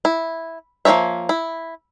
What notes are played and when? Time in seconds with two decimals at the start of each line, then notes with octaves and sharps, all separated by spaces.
0.05 E4
0.85 F3 A#3 E4 C#5 E5
1.29 E4